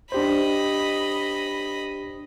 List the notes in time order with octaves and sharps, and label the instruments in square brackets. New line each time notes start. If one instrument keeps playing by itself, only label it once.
[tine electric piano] D4 G4 C5 [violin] D#5 B5